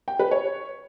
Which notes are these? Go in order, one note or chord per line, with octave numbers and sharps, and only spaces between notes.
G5
B4
C#5